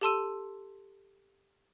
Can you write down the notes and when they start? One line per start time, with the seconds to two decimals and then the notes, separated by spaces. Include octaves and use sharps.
0.01 G4 A4 A5 C6 E6 D#7